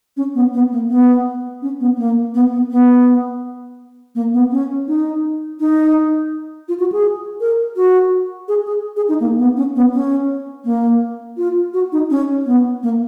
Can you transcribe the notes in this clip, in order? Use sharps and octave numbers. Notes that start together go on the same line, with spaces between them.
C#4
B3
B3
A#3
B3
C#4
B3
A#3
B3
B3
B3
A#3
B3
C#4
D#4
D#4
F4
F#4
G#4
A#4
F#4
G#4
G#4
G#4
D#4
A#3
B3
C#4
B3
C#4
A#3
F4
F#4
D#4
C#4
B3
A#3